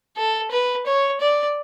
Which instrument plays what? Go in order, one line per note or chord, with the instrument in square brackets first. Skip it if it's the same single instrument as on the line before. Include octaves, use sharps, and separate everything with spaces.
[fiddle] A4
B4
C#5
D5